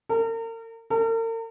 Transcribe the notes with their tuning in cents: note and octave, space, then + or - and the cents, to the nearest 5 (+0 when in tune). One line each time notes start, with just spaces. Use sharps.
A#4 -40
A#4 -45